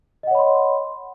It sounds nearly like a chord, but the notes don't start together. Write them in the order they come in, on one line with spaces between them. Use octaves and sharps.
D#5 F#5 C#5 B5 C6